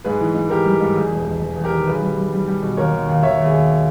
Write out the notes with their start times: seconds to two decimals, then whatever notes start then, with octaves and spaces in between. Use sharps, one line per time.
0.04 G#2 G#4 B4
0.21 E3
0.35 G#2
0.50 E3 G4 A#4
0.66 G3
0.81 G#2
0.96 E2 G#4
1.12 E1
1.27 E1
1.41 E1
1.56 E2
1.64 G4 A#4
1.72 D#3
1.87 B1 G#4 B4
2.02 G3
2.17 G3
2.33 G3
2.48 G3
2.62 B2
2.77 D#2 A#4 C#5
2.93 D#2
3.09 D#2
3.23 D#2 C#5 E5
3.39 D#2
3.46 G#4
3.53 D#2